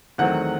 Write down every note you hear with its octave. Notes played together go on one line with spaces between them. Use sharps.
E2 D#3 F#3 A3 C4 F#5